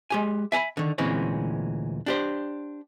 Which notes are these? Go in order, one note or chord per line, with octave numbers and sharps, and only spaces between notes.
G#3 G4 G#5
E5 G#5 A5 B5
D3 D#3
D2 A#2 E3 G#3 C4 C#4
D4 G4 C5